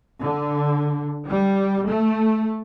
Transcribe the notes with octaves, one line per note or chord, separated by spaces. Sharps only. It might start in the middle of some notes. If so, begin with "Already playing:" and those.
D3
G3
A3